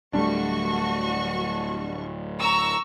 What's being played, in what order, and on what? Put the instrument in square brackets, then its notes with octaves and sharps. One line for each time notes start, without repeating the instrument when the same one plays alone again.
[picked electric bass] D1 A3 [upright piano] G3 D4 [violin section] F#4 C#6
[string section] A#5 C#6 E6